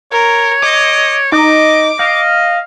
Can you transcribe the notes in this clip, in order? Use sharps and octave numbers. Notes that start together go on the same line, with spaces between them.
A#4 C#5
D#5 D6
D#4 D#5 D6
D#5 F5